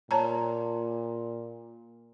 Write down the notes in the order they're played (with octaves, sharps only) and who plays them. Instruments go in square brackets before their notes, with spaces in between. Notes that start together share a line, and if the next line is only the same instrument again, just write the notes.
[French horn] A#2 [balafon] C#5 A5 A#5